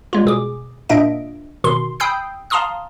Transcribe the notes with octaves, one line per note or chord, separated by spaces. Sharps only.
G3 G#3 F4
B2 G#4 D6
A#2 A#3 D4 D#5 E5 D7
B2 D#3 C6
G5 B5 D#6 E6 G6 C7
F5 A5 A#5 C6 D#6 F6